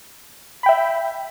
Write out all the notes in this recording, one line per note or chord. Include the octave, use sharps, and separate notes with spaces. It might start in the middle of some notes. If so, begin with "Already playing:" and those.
E5 G5 B5